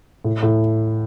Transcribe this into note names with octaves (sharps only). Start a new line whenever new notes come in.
A2
A2